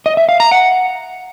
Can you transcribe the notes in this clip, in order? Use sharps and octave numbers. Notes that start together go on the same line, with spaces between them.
D#5
E5
F5
A#5
F#5